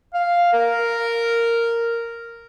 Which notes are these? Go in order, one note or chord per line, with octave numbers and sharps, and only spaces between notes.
F5
A#4